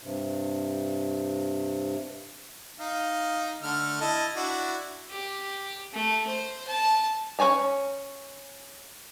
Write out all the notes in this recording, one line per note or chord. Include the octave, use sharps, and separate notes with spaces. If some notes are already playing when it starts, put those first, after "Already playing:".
G2 C3
D#4 F5
D3 A3 F6
E4 D#5 A5
D4 E4 F#4
G4
A3
C5
A5
C#4 B4 C#5 G#5 A#5